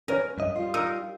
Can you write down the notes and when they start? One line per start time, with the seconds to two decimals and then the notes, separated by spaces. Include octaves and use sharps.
0.08 C#4 A#4 B4 C#5
0.38 G2 D#5
0.56 G3 F4
0.74 D#4 A#4 E6